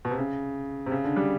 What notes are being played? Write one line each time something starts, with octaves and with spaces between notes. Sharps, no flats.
B2
C3
C#3
C3
C#3
D3
G3